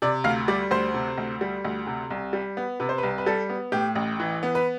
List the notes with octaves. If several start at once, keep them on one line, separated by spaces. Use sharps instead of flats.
C3 D5
D2 F5
G3 D5
D2 C5
C3
D2
G3
D2
C3
C2
G3
B3
C3 B4
C5
B4
C2
B4
G3 A4
B3
A2 G4
A1
E3
B3
B4